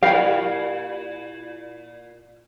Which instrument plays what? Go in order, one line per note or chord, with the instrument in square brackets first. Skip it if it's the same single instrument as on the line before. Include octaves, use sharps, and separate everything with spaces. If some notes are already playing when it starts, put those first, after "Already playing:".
[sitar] A#2 E4 [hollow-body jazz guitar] G4 A#4 G5 [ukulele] F5